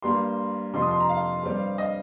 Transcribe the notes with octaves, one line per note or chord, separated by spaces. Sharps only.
G2 G3 A#3 C6
F2 C3 F3 C6
D#6
C6
A#5
F5
G2 G3 C4
D#5